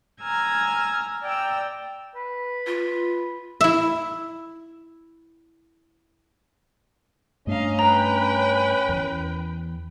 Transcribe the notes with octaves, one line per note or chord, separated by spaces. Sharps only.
G#5 A#5 E6 F6 G#6 A#6
D5 G5 A#5 E6
B4
F4
E4 E5
G2 A3 C#4 D4 D#5 F5 A#5
B4 G5 A#5
E2 E3